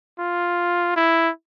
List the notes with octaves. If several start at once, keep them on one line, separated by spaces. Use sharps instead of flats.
F4
E4